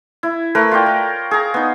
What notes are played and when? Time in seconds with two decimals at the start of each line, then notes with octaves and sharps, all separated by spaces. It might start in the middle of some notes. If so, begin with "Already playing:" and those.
0.23 E4
0.55 A3 A#4 B4
0.71 F4 C#5 D5 G5
0.86 A#4
1.31 G#4 A#5
1.54 B3 D#4